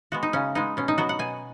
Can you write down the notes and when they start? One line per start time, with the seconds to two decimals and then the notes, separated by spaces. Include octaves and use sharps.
0.12 G#3 B3 F#4
0.23 D#4
0.33 C#3 C#4
0.55 G#3 B3 D#4
0.77 B2 C#4
0.88 D#4
0.98 F#3 B3 F#4
1.09 F#5
1.19 B2 G#5